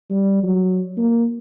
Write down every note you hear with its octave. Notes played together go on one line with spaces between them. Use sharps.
G3
F#3
A#3